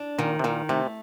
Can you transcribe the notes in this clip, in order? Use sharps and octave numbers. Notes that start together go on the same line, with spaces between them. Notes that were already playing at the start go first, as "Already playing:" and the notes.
Already playing: D4
A#2 D#3
C3
A#2 D#3
C3 A3